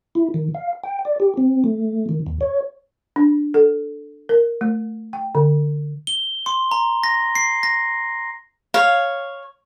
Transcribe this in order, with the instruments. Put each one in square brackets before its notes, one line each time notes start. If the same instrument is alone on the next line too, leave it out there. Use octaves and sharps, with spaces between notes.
[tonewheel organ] E4
D#3
F5
G5
D5
G4
C4
A3
D#3
D#2
C#5
[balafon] D4
A4
A#4
A3
G5
D3
[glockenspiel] G7
C6
A#5
A#6
C7
A#6
[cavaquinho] C#5 F5